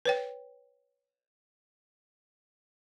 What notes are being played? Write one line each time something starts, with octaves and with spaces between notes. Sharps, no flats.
B4 C#5 G5